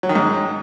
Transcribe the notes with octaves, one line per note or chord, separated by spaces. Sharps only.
F#3
D#3
G#2